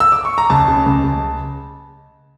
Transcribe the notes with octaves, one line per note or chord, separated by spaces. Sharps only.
E6
D6
C#6
A#5
C#2 A5
C#3
C#2
C#2